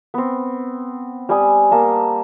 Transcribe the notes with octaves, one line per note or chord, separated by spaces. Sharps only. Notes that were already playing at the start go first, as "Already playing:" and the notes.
B3 C4
G3 G#5 D#6
A#3 A5